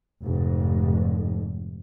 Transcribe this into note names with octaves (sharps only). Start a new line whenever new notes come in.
F1 G#2